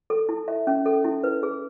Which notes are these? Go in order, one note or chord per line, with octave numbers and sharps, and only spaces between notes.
A4
E4
E5
C#4
A4
E4
B4
G#4